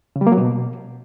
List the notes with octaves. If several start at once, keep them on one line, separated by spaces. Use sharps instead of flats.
C#3
G3
A#3
F#3
B2